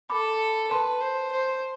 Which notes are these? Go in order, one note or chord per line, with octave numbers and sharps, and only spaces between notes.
A4 B5 D6
B4 A5 C6
C5
C5